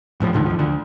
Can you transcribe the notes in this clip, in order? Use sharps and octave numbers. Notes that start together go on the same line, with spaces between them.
A1 A2 D3 F3
C#2 G#2 D3 D#3
E2 F3
D2 D3